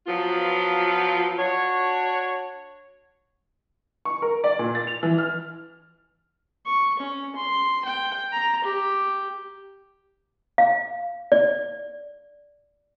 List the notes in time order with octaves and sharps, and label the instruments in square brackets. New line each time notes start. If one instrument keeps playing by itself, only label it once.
[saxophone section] F3 F#3 B3 F4
D4 F#4 C#5
[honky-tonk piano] C#6
A#4
D5
A#2
A6
F7
E3
F6
[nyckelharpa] C#6
C#4
C6
G5
A#5
G4
[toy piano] F5
D5